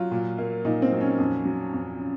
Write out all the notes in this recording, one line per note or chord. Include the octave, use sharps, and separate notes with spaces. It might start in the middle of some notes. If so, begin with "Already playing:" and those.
Already playing: F#3 F4
A#2
A#3
A#2 D#4
C4
F#3
C#4
F2
F#3
F2
C#3